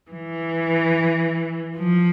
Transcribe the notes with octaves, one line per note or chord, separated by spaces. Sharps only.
E3
F3